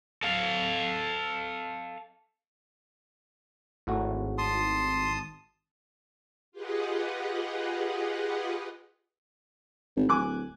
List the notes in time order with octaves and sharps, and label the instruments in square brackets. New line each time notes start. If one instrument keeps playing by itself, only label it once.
[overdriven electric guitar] A4 F5
[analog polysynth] G#1 [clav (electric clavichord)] A2 A3 F#4
[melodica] A5 D#6 [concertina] C6
[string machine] F4 G4 G#4 B4 D#5 F#5
[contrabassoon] G#1
[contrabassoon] D1 [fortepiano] G#5 D6 F#6